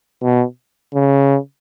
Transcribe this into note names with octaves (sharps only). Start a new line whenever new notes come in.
B2
C#3